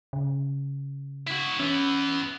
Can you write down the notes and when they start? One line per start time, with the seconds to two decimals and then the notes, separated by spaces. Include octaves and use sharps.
0.13 C#3
1.27 E4 F#4
1.60 E3 B3 C#4